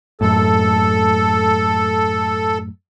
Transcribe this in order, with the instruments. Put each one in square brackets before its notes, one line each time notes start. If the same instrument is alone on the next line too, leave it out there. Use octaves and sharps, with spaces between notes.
[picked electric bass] F#2 A2 [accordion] A4